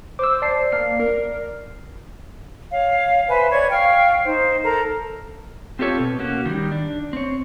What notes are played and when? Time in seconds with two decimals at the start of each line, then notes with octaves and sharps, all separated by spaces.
0.19 C5 D6 E6
0.42 D5 A5 C7
0.72 A#3 D5 F6 C7
1.00 A#4
2.71 C#5 F5
3.28 B4 C5 E5 G#5
3.50 C#5 D5 C#6 G#6
3.71 F5 G5 C#6 F6
4.24 D#4 C5
4.62 A4 A#4 A#5
5.79 C4 F4 G4 A4 C#5
6.00 B2
6.19 A#3 C#4 F#4
6.46 D#3 G3
6.72 D4
7.13 C4 C#5